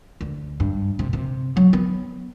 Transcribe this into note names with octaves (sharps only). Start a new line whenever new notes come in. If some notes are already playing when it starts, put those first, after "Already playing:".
D2
G2
C3
C3
F#3
B3